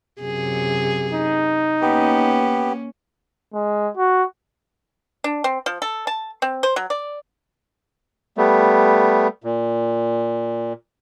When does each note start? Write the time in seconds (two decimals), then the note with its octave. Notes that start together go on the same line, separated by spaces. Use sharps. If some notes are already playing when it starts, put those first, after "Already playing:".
0.21 F#2 C3 G#4
1.14 D#4
1.82 A#3 B3 C#4 G4
3.54 G#3
3.97 F#4
5.24 D4
5.44 C4
5.66 F3
5.82 A4
6.07 A5
6.42 C4
6.63 C5
6.76 F#3
6.90 D5
8.37 G3 A3 B3
9.44 A#2